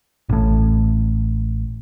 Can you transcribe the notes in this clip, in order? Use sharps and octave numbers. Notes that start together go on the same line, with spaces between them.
A1 A2